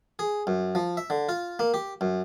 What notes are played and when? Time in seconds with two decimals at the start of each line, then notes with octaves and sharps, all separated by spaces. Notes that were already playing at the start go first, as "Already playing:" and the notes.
0.19 G#4
0.47 F#2
0.75 F3
0.97 E5
1.10 D3
1.29 F4
1.59 A#3
1.74 G4
2.01 F#2